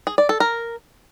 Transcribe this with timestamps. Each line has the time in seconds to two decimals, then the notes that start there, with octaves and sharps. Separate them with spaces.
0.07 G#4
0.18 D5
0.29 A4
0.40 A#4